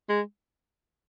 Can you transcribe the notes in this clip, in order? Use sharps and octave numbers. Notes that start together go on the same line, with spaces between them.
G#3